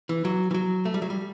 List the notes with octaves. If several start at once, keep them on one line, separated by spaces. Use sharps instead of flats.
E3
F#3
E3
F#3
A3
G3
F#3
G3